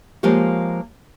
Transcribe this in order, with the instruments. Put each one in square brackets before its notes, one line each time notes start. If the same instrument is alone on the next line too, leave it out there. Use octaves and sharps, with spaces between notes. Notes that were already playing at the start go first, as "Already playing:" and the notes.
[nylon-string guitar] F3 G#3 A#3 F4 G4 C#5